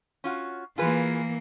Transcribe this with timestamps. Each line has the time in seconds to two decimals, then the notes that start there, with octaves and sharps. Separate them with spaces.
0.24 C#4 F4 F#4
0.78 E3 A#3 F4 G#4 B4